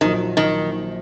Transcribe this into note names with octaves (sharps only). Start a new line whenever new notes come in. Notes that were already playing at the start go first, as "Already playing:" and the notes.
A#1 A#2 D#3 F#3
D#3